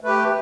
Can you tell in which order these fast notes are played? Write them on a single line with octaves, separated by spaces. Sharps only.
A3 B4 G4